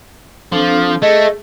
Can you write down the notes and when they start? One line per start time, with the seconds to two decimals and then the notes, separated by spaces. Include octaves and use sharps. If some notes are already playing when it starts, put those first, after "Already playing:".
0.52 F3 C4 D4 A4
1.02 A3 G#4 D#5